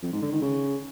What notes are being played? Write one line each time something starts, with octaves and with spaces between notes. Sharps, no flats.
F2
G#2
D3
D#3
C#3